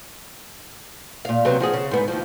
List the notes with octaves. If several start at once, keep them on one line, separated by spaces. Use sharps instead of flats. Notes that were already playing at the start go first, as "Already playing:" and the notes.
A#2 F5
C3 F#3 B3
F3 F#4 G#4
C#3
G#2 B3
D#2 F3